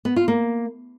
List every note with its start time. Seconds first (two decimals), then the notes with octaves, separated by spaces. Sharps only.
0.05 B3
0.16 F4
0.28 A#3